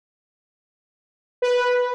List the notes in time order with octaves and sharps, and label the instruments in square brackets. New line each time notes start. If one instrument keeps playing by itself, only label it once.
[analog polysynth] B4